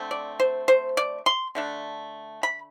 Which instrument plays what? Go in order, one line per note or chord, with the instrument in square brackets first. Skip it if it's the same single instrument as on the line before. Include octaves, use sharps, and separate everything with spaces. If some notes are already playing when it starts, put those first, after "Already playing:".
Already playing: [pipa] D3 A3 C4
D5
C5
C5
D5
C6
D3 A3 D4
B5